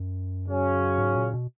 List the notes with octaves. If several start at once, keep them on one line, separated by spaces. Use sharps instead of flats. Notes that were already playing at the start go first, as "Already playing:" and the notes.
Already playing: F#2
C#3 F#3 C#4
G#2
A#2
B2